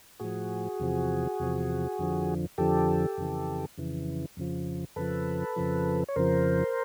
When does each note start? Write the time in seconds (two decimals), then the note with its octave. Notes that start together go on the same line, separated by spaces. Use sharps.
0.20 A2 F3 F#4 G#4
0.80 E2 C3 F3
1.40 E2 C3 F3
1.99 F2 D3 F3
2.58 F2 D3 F3 G4 A4
3.18 F2 C#3 E3
3.78 F2 C#3 E3
4.37 F2 C#3 F3
4.96 F2 C#3 F3 A4 B4
5.56 F2 C#3 F3
6.08 C#5
6.16 F2 C#3 F3 A#4 C5